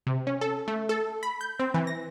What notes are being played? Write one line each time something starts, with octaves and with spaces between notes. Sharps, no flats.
C3
C#4
A4
A3
A4
B5
G6
C4
E3
A#6